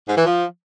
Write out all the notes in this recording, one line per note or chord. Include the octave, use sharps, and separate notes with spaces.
G#2
E3
F3